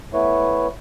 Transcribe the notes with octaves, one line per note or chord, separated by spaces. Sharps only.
A3 B3 E4 B4 C#5